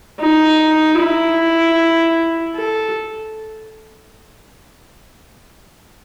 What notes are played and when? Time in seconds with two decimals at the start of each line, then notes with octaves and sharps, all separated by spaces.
0.20 D#4
0.99 E4
2.56 A4